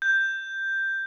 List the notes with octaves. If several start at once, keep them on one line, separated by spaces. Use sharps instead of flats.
G6